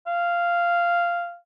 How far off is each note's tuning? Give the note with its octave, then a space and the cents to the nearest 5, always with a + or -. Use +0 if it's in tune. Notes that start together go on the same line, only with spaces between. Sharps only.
F5 -10